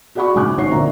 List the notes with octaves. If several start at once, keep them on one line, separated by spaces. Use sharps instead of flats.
F#4 G#4 D5 F#5 B5 C#6
A#1 G#2 C#3 G#5 D6 F#6
G#1 C5 C#5 F#5 C#6 C7
A#2 D3 D4 E5 A#5